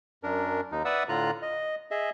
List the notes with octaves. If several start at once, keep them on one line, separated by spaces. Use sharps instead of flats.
F#2 D4 A#4
D#2 D#4
B4 D5 E5 F#5 D#6 E6
A2 D3 F4 A#5 F#6
D#5
G#4 D#5 E5